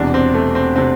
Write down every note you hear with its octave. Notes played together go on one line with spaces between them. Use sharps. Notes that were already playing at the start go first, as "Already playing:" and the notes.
Already playing: E1 E2 C3 D4
C4
A3
C4
C3 C4